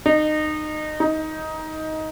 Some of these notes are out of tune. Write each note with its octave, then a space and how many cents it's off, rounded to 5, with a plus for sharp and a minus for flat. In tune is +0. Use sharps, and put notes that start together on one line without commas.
D#4 -25
D#4 +15